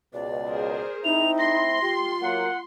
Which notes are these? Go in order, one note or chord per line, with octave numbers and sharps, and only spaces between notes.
C#2 B2 D5
G#4 A#4 C5
C4 D#4 E4 F7
C6 A#6
F4 G4
F#3 A#3 F#5